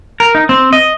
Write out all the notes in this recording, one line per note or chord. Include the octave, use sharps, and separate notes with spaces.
A#4
D#4
C4
D#5